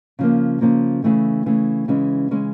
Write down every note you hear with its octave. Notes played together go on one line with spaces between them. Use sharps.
C#3 F3 A#3
C#3 F3 A#3
C#3 E3 A3
C#3 E3 A3
C#3 E3 G#3 C#4
C#3 E3 G#3 C#4